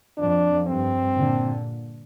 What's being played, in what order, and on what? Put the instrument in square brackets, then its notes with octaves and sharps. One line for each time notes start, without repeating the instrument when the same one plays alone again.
[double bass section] F2 [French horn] D4
[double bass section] G2 [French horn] C4
[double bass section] A#2 D3